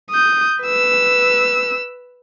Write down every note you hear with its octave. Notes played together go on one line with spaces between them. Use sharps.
D#6 G6
B4 E6